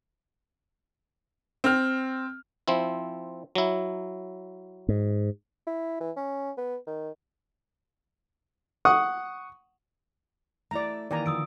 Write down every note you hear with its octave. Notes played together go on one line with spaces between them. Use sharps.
C4 F6
F3 C4 E4
F#3 E4
G#2
E4
E3
C#4
B3
D#3
F#5 C#6 D#6
A3 E4 D5 A#5
D#3 E3 A#3 D5 G#5 A#5
D3 F3 D#6 E6 D7